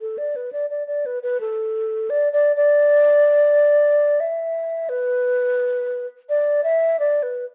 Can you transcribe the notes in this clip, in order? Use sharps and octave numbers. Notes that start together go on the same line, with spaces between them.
A4
D5
B4
D5
D5
D5
B4
B4
A4
D5
D5
D5
E5
B4
D5
E5
D5
B4